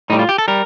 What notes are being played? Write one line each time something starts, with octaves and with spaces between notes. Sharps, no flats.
A2 G3 D#4
F4
G4
A4
G3 A#4